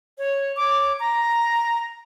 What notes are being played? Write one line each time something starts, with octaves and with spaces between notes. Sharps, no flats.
C#5
C#5 D6
A#5